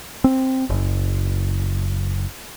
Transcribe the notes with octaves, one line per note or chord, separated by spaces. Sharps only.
C4
F#1